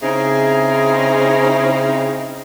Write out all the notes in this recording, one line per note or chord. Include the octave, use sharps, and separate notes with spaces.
C#3 C4 D#4 E4 G#4